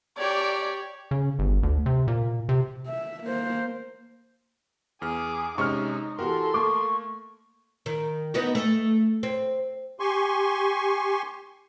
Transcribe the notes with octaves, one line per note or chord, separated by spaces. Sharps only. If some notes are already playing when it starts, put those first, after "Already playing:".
G4 C#5 D5
C#3
G1
D2
C3
A#2
C3
E5
A#3 C5
E2 G#4 D6 F6
C3 G#3 C#4 D#4 C#6 F6
E3 F#4 G4 A4 A#4 C6
A3 A#3 C#6 D6
D#3
B3 D#4 F#4
A3
C4
G4 G#5 C6 C#6